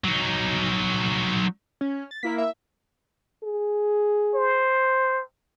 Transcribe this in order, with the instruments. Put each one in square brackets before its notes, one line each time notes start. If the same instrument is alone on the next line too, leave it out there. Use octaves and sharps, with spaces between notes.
[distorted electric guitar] F#3 D#4
[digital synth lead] C#4
A6
[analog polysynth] A#3 E4 A#4 [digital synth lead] B6
[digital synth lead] E5
[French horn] G#4
[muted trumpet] C5